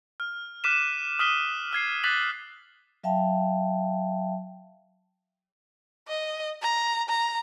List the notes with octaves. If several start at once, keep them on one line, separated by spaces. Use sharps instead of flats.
F6
D6 F6 F#6 B6 D#7 E7
D#6 F6 B6 D#7 G7
E6 F6 G#6 C7
D6 F#6 A6 B6 F7 F#7
F#3 E5 F5 G5 A5
D#5
A#5
A#5